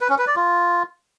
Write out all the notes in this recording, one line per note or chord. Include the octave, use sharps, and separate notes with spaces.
B4
C#4
B4
D5
F4